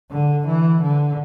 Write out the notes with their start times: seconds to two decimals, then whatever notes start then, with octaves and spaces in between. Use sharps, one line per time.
0.11 D3
0.47 E3
0.82 D3